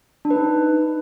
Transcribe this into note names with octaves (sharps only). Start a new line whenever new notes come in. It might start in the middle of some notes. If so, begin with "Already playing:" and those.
D4
B4
D#4